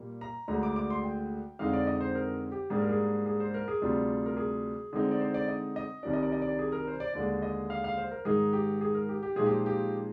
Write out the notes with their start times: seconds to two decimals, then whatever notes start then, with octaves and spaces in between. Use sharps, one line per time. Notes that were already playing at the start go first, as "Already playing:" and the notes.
Already playing: A#2 G3 A#3
0.21 A#5
0.48 D2 D3 G#3 A#5
0.63 D6
0.76 D6
0.90 C6
1.04 G5
1.59 F2 D3 G#3 D#4 F5
1.73 D5
1.87 D#5
2.01 C5
2.15 A#4
2.52 G4
2.70 G#2 G3 A#3 D4 G#4
2.80 A#4
2.89 G#4
3.26 G#4
3.40 C5
3.54 A#4
3.68 G#4
3.82 D2 C3 G3 D4 F4
4.26 A#4
4.37 G#4
4.93 D3 G#3 C4 D#4 G#4
5.11 D5
5.20 C5
5.34 D5
5.48 D#5
5.76 D#5
6.03 C2 C3 D#3 G3 D4 D5
6.13 D#5
6.23 D5
6.32 D#5
6.42 D5
6.59 G#4
6.72 A#4
6.87 C5
7.00 D5
7.14 D#2 D3 G#3 D5
7.42 D#5
7.70 F5
7.84 F5
7.98 C5
8.11 A#4
8.25 G#2 D#3 G#3 D#4 G#4
8.53 G4
8.81 G#4
8.94 A#4
9.09 G4
9.23 G4
9.36 A#2 F3 G#3 D#4 G#4
9.46 G4
9.66 G4